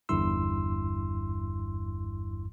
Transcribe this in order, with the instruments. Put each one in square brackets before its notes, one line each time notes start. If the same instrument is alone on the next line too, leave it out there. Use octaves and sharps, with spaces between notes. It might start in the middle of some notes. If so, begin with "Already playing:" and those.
[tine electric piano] G1 E2 G2 E4 C6 E6